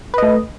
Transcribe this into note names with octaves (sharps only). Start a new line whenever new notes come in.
A3 B4 D#5